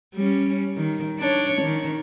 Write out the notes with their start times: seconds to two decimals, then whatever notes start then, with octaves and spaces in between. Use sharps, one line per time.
0.15 G3 C#4
0.76 D#3
1.19 D4 C#5
1.62 D#3